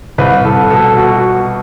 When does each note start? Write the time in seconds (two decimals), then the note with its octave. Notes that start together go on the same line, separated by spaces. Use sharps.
0.18 C2 B4
0.45 C2 A4
0.70 B2 A4
0.97 B2 F#4